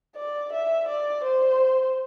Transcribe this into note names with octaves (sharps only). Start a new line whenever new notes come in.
D5
E5
D5
C5